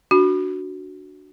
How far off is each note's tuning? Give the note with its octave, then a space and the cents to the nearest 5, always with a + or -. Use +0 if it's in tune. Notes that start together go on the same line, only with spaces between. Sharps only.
D4 +0 F#4 +0